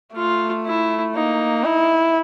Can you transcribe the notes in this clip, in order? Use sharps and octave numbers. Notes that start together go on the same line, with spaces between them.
A3 F4
E4
A#3 D#4
E4